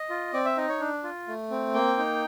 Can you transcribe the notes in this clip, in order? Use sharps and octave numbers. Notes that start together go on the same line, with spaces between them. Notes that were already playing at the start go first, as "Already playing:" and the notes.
Already playing: D#5
F4
C4 D5
E5
D#4 D#5
C#5
D4
F4
A3
C4
A#3 G5
D#4